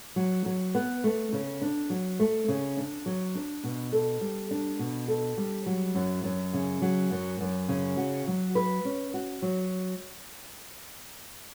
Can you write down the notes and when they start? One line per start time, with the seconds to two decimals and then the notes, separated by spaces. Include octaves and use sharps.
0.16 F#3
0.46 F#3
0.75 B3
1.04 A3
1.33 C#3
1.61 D4
1.90 F#3
2.19 A3
2.48 C#3
2.77 D4
3.06 F#3
3.35 D4
3.63 B2
3.93 A4
4.21 G3
4.51 D4
4.79 B2
5.08 A4
5.37 G3
5.66 F#3
5.95 F#2
6.24 F#2
6.53 C#3
6.82 F#3
7.11 F#2
7.41 F#2
7.69 C#3
7.97 F#4
8.27 F#3
8.55 B4
8.85 C#4
9.14 F#4
9.42 F#3